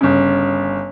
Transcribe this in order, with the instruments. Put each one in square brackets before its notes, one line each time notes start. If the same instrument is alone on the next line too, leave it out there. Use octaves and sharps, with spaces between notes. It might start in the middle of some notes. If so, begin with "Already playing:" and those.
[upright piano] G1 C#3